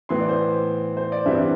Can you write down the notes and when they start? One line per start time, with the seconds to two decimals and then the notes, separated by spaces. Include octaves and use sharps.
0.09 A2 E3 B3 C6
0.20 D5
0.29 C5
0.97 C5
1.12 D5
1.26 G2 E3 G3 C4 E5
1.35 D5